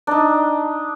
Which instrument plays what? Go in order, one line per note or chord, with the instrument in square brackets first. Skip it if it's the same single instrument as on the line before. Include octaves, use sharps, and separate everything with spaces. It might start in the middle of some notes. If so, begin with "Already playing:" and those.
[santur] D4 D#4